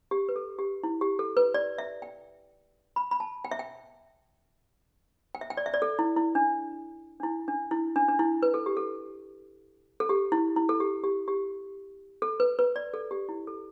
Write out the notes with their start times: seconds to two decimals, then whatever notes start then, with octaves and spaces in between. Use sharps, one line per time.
0.11 G4
0.29 B4
0.36 A4
0.59 G4
0.84 E4
1.01 G4
1.19 A4
1.37 B4
1.54 D5
1.78 E5
2.02 G5
2.96 B5
3.11 B5
3.20 A5
3.45 G5
3.51 E5
3.59 G5
5.35 G5
5.41 E5
5.50 G5
5.57 D5
5.66 E5
5.74 D5
5.82 A4
5.99 E4
6.16 E4
6.35 D4
7.20 D4
7.23 E4
7.48 D4
7.71 E4
7.96 D4
8.09 D4
8.19 E4
8.43 B4
8.54 A4
8.66 G4
8.77 A4
10.00 A4
10.09 G4
10.32 E4
10.56 E4
10.69 A4
10.80 G4
11.04 G4
11.28 G4
12.22 A4
12.40 B4
12.59 B4
12.76 D5
12.94 A4
13.11 G4
13.29 E4
13.47 A4